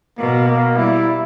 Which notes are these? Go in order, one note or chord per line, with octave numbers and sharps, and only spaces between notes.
B2 A#3
A#3
G3 E4